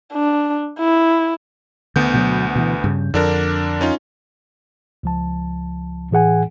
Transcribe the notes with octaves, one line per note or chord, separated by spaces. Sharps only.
D4
E4
D2 D3 B3 G6
B2 F3 F#3
B2 E3
G2 C#3
F2 D3 D4 A#4
C#4 D#4 F4
C#2 F3 A5
A2 E3 G#4 F#5 G#5